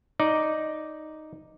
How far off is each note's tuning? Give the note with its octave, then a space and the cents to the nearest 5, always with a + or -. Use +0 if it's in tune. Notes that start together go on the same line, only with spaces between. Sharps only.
D#4 +0 D5 +0